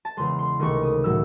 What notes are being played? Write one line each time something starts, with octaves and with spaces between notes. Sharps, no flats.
A5
E2 C#3 G#3 C6
C6
C#2 C3 D#3 A3 C#6
D#6
A2 F#3 A3 E6